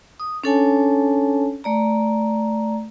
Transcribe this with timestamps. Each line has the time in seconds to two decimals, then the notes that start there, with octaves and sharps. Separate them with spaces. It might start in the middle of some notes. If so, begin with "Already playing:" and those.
0.20 D#6
0.44 C#4 D4 A4 C#5 G#5 A5
1.64 A3 D5 A#5